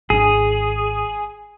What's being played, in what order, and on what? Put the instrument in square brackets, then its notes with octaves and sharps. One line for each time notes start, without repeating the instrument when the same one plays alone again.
[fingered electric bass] G#1 C#3 D4 [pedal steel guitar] G#4